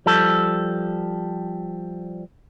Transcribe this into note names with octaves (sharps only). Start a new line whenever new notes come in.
F3 G3 A4